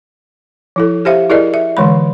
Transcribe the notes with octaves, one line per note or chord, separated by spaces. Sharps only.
F3 E4 A4
G4 C5 E5 F5
E4 G#4 A#4 D5 D#5
E5
D3 E3 G#3 B5